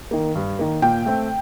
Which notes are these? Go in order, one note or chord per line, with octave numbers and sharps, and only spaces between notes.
D#3 A#3
G2
D#3 A#3
A#2 G5
A3 C4